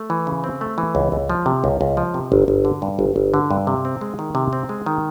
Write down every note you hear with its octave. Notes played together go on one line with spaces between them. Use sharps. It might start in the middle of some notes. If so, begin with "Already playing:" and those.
Already playing: A3
E3
C#3
C4
A3
E3
C#2
C#2
F3
C3
C#2
C#2
F3
C3
G1
G1
D3
G2
G1
G1
D3
G2
C3
C4
G#3
D#3
C3
C4
G#3
D#3